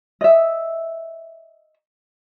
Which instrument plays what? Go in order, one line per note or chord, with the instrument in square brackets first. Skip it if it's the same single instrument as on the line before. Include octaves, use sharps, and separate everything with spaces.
[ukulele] D#5 E5